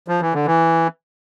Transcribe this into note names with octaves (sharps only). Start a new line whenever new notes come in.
F3
E3
D3
E3